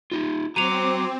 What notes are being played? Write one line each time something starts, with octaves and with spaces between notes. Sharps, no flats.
D#4 F4
C4 F#4 A#5 C6 D6 D#7 F7